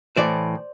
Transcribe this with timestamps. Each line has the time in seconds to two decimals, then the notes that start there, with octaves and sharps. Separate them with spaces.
0.16 A2 E3 C5 D5